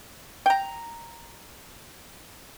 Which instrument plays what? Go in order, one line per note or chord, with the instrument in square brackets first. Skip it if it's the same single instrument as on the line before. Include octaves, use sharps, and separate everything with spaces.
[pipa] G5 A#5